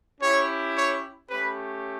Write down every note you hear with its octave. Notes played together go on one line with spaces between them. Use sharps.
C#4 E4 G4 C#5
C#5
A3 C#4 G4 B4